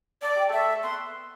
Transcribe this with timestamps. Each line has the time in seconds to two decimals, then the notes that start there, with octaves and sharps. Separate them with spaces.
0.22 A4 D5
0.36 G4
0.49 A3 A4 E5
0.75 A4
0.83 B3 B4 C6